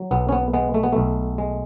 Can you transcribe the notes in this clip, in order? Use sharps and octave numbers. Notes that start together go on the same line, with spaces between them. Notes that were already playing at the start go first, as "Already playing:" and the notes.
Already playing: F#3
B1 B3
C#4
B3
G#3 B3
A3
B3
B1 A3
G#3